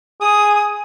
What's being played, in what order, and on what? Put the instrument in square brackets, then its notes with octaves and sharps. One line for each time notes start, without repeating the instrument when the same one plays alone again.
[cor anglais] G#4 [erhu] D#6